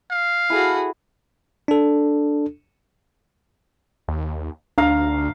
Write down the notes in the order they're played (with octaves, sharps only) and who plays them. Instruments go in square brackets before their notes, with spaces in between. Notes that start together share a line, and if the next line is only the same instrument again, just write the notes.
[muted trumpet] F5
[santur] E4 A4 [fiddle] F#4 G#4
[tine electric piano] D4 A4
[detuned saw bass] D#2
[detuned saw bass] D2 [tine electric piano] D4 [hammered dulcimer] F5 A#5